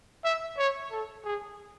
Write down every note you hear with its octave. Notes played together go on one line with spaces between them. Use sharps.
E5
C#5
A4
G#4